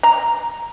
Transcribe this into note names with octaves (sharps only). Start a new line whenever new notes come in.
A#5